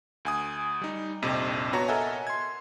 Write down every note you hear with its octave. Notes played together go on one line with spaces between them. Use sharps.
D2 G#5 D#6
G3 D#4
A#1 F2 C3 D#5
B3 F#4 C#5 A5 A#5
A4 A#4 D#5 E5 F#5 G#5
C6 G#6